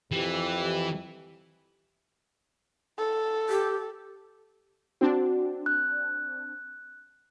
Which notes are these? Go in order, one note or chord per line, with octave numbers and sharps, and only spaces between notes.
F2 E3 G4
A4
G4
C4 D4 F#4
F#6